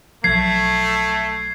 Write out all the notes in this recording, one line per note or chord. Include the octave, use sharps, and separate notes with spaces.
B1 F3 A3 G#6 C7